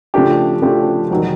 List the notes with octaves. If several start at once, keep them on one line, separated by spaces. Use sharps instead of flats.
C#3 F3 A3 D4 G4
C#3 F3 A3 D4 G4
E1 D#3 F#3